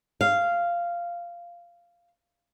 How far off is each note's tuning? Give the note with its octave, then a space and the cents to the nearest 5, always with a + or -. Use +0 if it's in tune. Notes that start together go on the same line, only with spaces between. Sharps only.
F5 -10